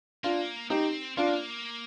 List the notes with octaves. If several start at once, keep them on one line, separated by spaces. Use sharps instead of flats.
A#3 D4 F4
C4 D#4 G4
A#3 D4 F4